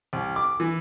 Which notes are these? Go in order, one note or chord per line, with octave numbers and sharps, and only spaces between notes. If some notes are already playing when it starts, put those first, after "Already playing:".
C2
D6
E3